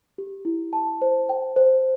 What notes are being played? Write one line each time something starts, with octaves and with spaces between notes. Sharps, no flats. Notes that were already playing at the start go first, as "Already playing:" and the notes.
G4
E4
A5
C5
G5
C5